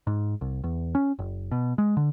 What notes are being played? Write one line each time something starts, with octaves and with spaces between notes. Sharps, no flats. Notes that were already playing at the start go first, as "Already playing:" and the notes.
G#2
C2
E2
C#4
F#1
B2
G#3
D3